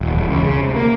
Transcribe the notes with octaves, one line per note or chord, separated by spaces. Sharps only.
D#1
E1
C#2
C#3
C3
A#3